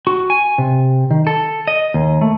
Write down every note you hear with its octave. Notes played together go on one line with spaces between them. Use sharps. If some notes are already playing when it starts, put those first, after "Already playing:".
F#4
G#5
C3
D#3
A4
D#5
D#2
A3